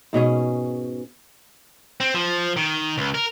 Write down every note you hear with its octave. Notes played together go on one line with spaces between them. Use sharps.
G#2 B2 C#4 G#4
C4
F3
D#3
C#2
A#4